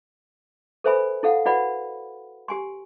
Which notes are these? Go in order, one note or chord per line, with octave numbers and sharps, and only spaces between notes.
A4 B4 C5 E5 G#5 B5
E4 A4 F5 F#5
E4 F#4 B4 D5 F#5 B5
G4 G#5 C6